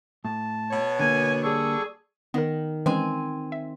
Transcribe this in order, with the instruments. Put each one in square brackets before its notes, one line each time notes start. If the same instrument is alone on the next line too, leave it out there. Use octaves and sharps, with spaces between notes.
[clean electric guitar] A2 [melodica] A5
[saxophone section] B2 C#5
[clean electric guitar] D3 A#3 [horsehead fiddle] G#5
[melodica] G3 A4 C#6 [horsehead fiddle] G#4
[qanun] D#3 [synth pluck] B3 A#4
[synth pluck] E3 G#3 C#4 [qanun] C4 G#5
[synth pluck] E5